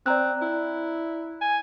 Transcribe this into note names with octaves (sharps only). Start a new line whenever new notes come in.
C4 D5 A#5 F#6
E4
G#5